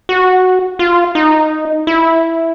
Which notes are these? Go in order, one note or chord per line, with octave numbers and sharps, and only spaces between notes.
F#4
F4
D#4
E4